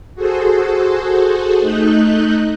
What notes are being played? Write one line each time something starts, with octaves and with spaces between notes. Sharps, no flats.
F#4 G#4 A4 C5
A3 D#4 D#5 F#6 G6